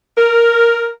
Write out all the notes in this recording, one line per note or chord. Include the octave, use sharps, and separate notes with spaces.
A#4